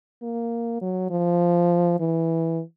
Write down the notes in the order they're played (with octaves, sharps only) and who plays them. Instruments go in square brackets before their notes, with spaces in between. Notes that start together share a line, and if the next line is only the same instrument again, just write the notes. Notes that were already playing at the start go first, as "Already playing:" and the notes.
[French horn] A#3
F#3
F3
E3